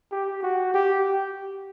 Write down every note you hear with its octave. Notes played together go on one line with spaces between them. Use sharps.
G4
F#4
G4